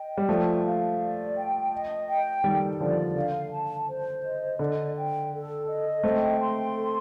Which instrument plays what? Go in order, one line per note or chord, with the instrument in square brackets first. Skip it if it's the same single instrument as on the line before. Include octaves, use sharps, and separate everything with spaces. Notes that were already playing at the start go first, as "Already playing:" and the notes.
Already playing: [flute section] D#5 G5
[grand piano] G3
[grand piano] F3 A3 [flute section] D5
[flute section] F5
D5
G5
D#5
G5
[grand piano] D#3 G3 [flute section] A4
[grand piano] D3 F3 [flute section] D5
[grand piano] D3 [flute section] F5
[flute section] A5
C5
D#5
[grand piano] D3 [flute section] D5
[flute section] G5
A4
D#5
[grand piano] A3 C4 [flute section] G5
[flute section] C6
A4